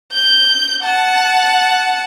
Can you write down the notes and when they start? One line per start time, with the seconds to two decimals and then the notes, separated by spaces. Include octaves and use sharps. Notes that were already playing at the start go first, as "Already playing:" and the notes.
0.13 G6
0.83 F#5 A5